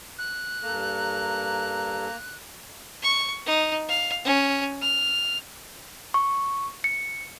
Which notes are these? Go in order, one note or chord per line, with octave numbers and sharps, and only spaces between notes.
F#6
G2 A#3 A4 A#5
C#6
D#4
F5
C#4
F6
C#6
C#7